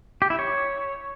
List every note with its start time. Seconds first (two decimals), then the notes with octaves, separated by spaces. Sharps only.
0.22 G4
0.30 E4
0.39 C#5